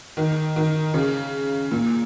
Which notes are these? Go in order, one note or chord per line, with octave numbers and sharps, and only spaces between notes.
D#3
D#3
C#3
A#2